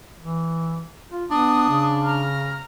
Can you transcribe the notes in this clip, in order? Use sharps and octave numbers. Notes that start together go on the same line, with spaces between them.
E3
F4
B3 D4 D#6
C#3
A#5 F6